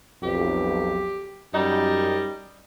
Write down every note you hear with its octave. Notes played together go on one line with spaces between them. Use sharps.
B1 F2 G4
F#2 G3 D#4